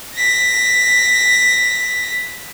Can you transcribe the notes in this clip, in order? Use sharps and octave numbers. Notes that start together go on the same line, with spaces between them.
A#6 B6